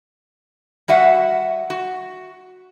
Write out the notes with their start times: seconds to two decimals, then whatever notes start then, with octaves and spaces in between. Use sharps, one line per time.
0.88 G3 F#4 E5 F#5
1.70 F#4